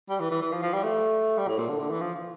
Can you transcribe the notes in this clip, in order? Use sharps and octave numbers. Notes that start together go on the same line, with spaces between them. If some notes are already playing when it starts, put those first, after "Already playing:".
G3
E3
E3
E3
F3
F3
G3
A3
G3
A2
A#2
D3
D3
E3
F3